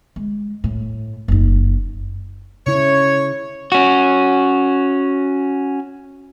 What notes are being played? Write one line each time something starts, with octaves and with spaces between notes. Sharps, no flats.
G#3
A2
F#1 D#4
C#3 E4 C#5
C#4 F#4